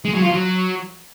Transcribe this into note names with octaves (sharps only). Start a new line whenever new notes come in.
G#3
F#3
F4
F#3